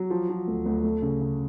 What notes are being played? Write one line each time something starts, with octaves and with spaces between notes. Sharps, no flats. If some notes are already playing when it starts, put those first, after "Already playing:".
Already playing: F#3
F3
F3
D2
D2
A3
C#3
C#3